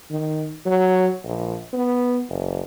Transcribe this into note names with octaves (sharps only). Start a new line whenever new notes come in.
D#3
F#3
A#1
B3
F#1